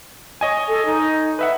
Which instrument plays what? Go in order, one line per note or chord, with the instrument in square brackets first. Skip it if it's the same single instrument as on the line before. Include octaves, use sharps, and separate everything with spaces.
[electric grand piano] C#5 D#5 G#5
[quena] A4
D#4
[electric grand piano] B4 E5 F#5